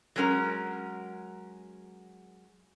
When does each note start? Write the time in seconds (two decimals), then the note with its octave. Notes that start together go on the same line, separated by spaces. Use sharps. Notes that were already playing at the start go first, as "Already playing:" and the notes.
0.16 F#3 G#3 C#4 A#4 A#5